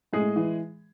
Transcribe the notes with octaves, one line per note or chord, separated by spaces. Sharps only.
A2 G#3 G#4
E3